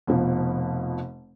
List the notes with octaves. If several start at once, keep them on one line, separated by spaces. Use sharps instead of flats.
F1 B2 F3